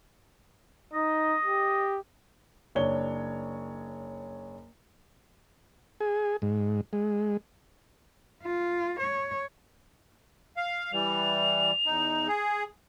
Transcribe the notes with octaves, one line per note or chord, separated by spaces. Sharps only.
D#4 D#5
G4
F#1 D4 C#5 G7
G#4
G#2
G#3
F4
C#5
F5
E3 G3 F7
E2 D#4
G#4